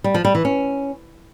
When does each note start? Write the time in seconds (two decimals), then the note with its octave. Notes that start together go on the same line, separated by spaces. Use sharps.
0.04 G3
0.14 F3
0.25 G3
0.35 E3
0.45 C#4